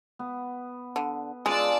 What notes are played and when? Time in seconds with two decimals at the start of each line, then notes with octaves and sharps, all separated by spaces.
0.19 B3
0.96 D3
1.46 G#3 D4 F4 G#4 D5 A5 E6